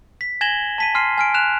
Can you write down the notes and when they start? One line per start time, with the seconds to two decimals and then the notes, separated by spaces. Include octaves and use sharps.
0.21 B6
0.41 G#5 G#6 A#6 E7 F#7 G7
0.78 A5 B6 D#7
0.94 G#5 C6 F6 C7 D#7
1.18 G#5 F6 D7
1.34 F#6 E7 F7